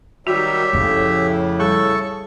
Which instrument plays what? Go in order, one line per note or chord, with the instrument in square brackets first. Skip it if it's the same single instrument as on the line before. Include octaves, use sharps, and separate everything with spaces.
[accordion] D#3 F#3 G3 [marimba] F#4 [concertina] G4 E5
[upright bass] F2 [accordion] A2 C#3
[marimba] G3 G#4 [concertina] A4 C#6